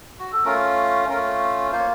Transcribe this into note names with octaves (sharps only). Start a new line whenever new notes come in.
F#4
A4
A3 C#4 F4 A#4
A3 C#4 F4 A#4
A#3 F4 C5
C#5